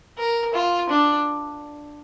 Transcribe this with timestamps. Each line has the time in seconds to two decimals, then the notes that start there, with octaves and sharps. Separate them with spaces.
0.18 A#4
0.54 F4
0.90 D4